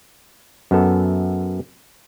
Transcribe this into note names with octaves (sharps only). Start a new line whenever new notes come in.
F#2 B3 A4